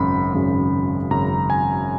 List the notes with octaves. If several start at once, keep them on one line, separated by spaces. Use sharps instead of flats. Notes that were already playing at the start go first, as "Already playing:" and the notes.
Already playing: G#1 F#2 C#3 B5
G#1 F#2 C#3
G#1 F#2 C#3 A#5
G#5